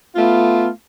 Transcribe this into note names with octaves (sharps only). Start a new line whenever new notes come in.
A3 B3 F4